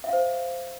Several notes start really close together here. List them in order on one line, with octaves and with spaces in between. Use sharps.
E5 F5 C5